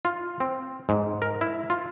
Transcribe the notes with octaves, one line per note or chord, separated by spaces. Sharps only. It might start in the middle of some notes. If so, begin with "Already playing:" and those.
F4
C4
G#2
A#4
E4
F4